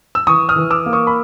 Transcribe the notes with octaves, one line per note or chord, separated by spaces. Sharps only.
E6
E3 C#6 D#6
D#6 F6
E3
D6 E6
A#3
C#6 D#6
B5